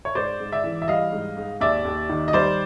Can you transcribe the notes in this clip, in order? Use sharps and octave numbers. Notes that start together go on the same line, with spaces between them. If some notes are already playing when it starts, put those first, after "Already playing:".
C#5
G#2 C5 D5
G#2
D5 E5
E3
E5
G3 D#5 F5
G#2
G#2
D#2 D5 E5
D#2
D#3
D#5
G3 C5 D5